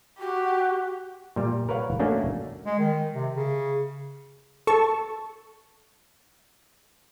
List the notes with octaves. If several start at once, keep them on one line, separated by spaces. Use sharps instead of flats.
F#4 G4
A#2 G3
A#4 B4 C#5 F5 F#5
A3 A#3 C#4 D4 F#4
G#3
D#3
C3
C#3
A4 A5 C#6